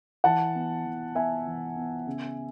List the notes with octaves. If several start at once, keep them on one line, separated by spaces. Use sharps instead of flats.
E3 F#5 A5
B3
E3
B3 E5 G#5
E3
B3
C#3